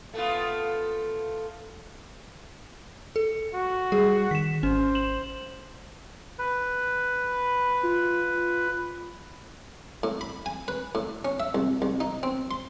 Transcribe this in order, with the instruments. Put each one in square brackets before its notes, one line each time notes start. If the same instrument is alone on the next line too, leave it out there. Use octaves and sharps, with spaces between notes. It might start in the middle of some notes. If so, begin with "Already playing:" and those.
[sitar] A3 B3 F4
[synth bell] A4
[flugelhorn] F#4
[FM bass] G3 [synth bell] G#4
[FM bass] D#3 [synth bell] B6 E7
[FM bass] G#1 [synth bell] C#4 [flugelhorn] C5
[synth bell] E7 F#7
[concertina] B4
[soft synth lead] F4
[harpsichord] A2
B5
G#5
B4
A2
C#4
E5
C2
C2
D#4
C4
C6